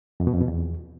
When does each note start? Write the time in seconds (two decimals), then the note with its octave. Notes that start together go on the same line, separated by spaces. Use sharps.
0.20 F2
0.27 B2
0.34 F2
0.41 B2
0.48 E2